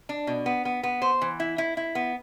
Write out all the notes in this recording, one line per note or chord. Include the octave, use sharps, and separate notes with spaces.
D4
B2
B3
B3
B3
C5
E3
E4
E4
E4
B3